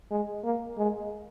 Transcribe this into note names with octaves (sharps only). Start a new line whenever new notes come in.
G#3
A#3
G#3